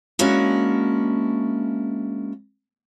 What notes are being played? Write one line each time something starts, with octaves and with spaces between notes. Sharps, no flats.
G#3 A#3 C#4 D4 E4 F#4